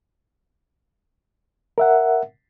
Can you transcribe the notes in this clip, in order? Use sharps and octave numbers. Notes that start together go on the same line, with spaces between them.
A#4 E5 F#5